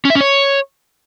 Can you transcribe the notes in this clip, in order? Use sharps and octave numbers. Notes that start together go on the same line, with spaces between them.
C#4
E5
C#4
C#5